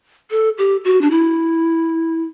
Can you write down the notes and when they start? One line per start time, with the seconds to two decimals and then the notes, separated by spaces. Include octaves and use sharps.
0.31 A4
0.58 G4
0.85 F#4
1.01 D4
1.11 E4